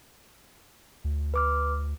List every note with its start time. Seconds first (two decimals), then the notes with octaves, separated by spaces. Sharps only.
1.04 D2
1.34 B4 D6 F6